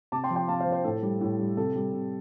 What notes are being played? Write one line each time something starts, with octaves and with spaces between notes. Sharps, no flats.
C3 A5 D6
G5 C6
F3
G5 C6
C3 F5 A5
C5 F5
F3
C5
A2 A4
G3
A2
G3
C3 A4
G3
C3